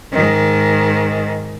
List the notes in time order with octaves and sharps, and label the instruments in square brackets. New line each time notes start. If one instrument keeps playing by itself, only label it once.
[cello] G#2 D#3